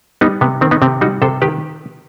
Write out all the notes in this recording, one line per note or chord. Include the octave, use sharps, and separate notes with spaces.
G3 B3 D#4
C3 B3
D#3 C4
B3 D#4
C3 C4
G3 D#4 F#4
C3 A4 C5
D#3 G4 B4